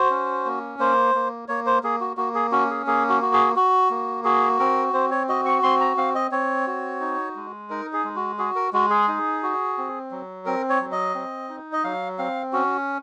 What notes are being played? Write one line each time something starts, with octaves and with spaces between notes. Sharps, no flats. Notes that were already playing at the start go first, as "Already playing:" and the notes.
Already playing: F#4 C5
C#4
A#3
A#3 C5
A#3
A#3 C#5
C5
A#3 G#4
F#4
A#3 F#4
G#4
C#4 F#4
G#4
A#3 G#4
F#4
F#4
G#4
F#4
A#3
F#4 G#4
C4 A#4
C4 C5
C#5
F#4 D#5
C#6
C4 C6
A#5
C4 F5
D#5
C4 C#5
F#4
D#4
G#3
D#4 A#4
G#4
G#3
F#4
F#4 G#4
A#4
G#3 F#4
G#4
D#4
F#4
C4
F#3
C4 A#4
C#5
F#3
D#5
C4
D#4
D#5
F#3 F5
C4 F5
C#4 F#4